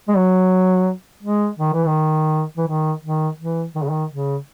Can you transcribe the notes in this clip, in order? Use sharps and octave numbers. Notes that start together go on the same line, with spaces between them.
G#3
F#3
G#3
D#3
E3
D#3
E3
D#3
D#3
E3
D#3
C#3
D#3
C#3